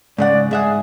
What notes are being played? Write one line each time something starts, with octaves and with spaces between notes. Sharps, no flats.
G#2 C#3 D5 F#5
G#2 G#4 E5 F#5